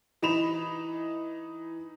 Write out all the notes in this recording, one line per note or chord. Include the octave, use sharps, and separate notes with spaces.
E3 D#4 B5 E7 F7